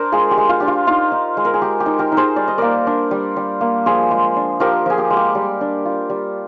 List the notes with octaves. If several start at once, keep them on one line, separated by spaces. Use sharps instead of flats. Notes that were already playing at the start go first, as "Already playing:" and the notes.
Already playing: D4 A#4 C5 D5
G#3 F4 G#4
G4
G#3
F4
D4 G4
F4
D#4 F4
D#4
G#3
A#4
G#4
G#3 G4
G4
D#4
G4 A#4
D#4
G#4 C5
G3 D5
D#5
A#3 A#4 D5
D4
G3
G3
A#3
F3 G#4 C5
G#3
D4
F3 G4 A#4
F3 G#4
G4
G#3
G4
G3
D4
F4
G3